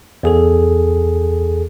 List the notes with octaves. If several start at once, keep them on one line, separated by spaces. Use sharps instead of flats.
E2 G#4 A4